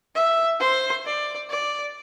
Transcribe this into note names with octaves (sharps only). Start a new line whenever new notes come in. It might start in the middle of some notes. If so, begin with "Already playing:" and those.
E5
C5
D5
D5